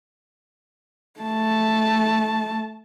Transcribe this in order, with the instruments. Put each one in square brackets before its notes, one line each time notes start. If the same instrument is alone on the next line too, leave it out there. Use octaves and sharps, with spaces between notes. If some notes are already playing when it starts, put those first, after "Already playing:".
[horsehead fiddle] A3 A5